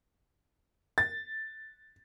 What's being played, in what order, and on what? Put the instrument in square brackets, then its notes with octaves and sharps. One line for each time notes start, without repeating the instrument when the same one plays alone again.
[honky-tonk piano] A6